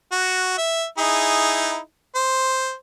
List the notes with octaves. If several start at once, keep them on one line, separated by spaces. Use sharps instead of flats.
F#4
E5
D#4 E4 G#4
C5